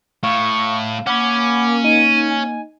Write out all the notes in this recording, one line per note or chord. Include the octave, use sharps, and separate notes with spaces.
A2 F5 C#6
A#3 C#4 F#5 B5 D6
D#4 D#7
G#5